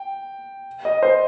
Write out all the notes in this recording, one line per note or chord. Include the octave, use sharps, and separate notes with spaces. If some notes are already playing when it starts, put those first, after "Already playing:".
Already playing: G5
D#5
C5